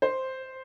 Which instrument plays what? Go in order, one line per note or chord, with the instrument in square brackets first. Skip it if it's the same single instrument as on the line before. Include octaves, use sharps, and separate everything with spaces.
[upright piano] C5